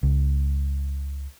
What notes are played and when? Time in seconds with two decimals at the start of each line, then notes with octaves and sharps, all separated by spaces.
0.03 C#2